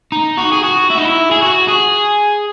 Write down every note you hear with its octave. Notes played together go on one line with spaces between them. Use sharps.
D#4
F#4
G#4
F#4
E4
D#4
E4
G#4
F#4
G#4